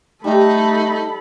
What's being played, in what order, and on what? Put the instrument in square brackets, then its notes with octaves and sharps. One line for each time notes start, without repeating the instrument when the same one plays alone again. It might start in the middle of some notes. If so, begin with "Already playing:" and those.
[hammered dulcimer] G3 [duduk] A3 [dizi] D#4 [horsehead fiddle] A4 B5